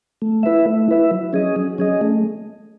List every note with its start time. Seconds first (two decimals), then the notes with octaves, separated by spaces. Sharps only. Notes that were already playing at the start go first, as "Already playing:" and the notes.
0.22 A3
0.43 E4 B4 E5
0.66 A3
0.88 E4 B4 E5
1.11 F#3
1.33 C#4 G#4 D#5
1.56 F#3
1.78 C#4 G#4 D#5
2.01 A3